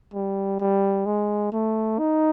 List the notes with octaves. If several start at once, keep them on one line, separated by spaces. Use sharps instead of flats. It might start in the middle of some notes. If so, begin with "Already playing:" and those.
G3
G3
G#3
A3
D#4